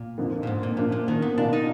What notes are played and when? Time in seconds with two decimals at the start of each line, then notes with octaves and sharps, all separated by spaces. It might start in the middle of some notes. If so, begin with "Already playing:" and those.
Already playing: A#2
0.17 F2 D3 F3 A#3
0.43 A#2
0.47 G#2
0.63 A#2
0.77 F#2 A#2 F3 A#3 D4
0.92 A#2
1.08 D#3
1.22 B3
1.37 B1 B2 A#3 D4 F4
1.53 D#4